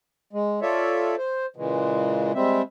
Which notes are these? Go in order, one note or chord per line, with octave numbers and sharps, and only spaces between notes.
G#3
F4 A4 C#5 D5 E5
C5
A#2 C#3 E3 G#3
G3 G#3 C4 E5